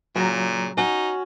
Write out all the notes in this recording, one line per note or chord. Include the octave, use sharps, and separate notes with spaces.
A#2 C#3 F#3 A#5
C#4 D#4 F#4